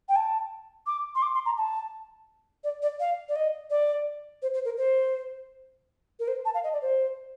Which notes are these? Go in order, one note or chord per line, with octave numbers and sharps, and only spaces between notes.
G5
A5
D6
C6
D6
C6
A#5
A5
D5
D5
F5
D5
D#5
D5
C5
C5
A#4
C5
A#4
C5
A5
F5
D#5
D5
C5